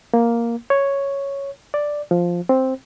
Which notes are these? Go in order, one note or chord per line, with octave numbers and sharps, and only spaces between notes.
A#3
C#5
D5
F3
C4